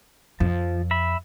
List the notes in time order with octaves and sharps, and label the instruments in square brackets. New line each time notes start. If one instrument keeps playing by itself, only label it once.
[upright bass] F2 [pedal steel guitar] F3
[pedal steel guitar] E5 B5